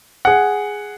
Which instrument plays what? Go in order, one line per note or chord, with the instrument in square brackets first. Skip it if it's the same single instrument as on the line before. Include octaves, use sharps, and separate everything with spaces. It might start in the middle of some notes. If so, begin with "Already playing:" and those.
[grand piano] G#4 F#5